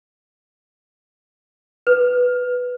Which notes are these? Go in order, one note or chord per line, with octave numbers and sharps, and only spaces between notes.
B4